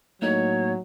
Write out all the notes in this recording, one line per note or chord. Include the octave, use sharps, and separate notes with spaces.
A2 F#3 A#3 D#4 C#5